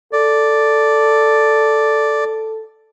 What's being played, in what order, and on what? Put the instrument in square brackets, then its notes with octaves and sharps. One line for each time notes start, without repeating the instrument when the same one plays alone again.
[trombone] A4 [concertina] D5